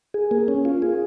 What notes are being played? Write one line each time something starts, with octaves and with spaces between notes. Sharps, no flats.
G#4
A#3
C#4
F4
G#4